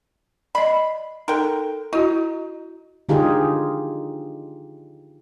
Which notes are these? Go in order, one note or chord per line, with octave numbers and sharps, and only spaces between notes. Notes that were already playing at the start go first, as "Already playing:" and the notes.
D5 D#5 B5
D#4 A4 A#4 G5
D#4 E4 F#4
D3 D#4 F4 G4 G#4